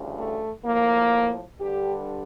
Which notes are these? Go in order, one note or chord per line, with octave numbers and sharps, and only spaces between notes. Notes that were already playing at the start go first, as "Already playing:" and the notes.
Already playing: D2 C#3 E3 G3
A3
A2 F3 A#3
G2 D3 G3 G4